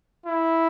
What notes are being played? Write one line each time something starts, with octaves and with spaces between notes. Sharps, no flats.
E4